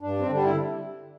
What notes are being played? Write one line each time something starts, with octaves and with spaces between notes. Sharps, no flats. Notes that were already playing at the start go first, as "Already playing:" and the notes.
G2 D4
C4
D3 G3 D4
E4